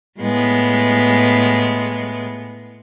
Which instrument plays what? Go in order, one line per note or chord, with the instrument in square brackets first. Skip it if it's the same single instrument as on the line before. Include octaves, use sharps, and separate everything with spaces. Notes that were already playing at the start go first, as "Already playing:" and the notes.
[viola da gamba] A2 G#3 B3